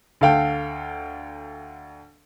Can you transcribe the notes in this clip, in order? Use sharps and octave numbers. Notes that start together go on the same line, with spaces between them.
D2 A4 F5 G5